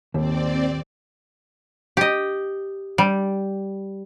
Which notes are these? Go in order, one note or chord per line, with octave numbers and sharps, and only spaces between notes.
D#1 G#1 D#2 C4 D5
G4 D#5
G3